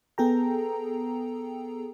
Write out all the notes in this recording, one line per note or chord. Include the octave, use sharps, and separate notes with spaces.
B3 G#4 A4 G5 A#5